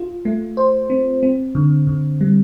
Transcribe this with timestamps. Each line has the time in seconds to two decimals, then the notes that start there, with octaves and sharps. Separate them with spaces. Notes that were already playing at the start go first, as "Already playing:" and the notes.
Already playing: F4
0.25 A3
0.57 C5
0.90 C4
1.23 C4
1.55 D3
1.87 D3
2.21 G3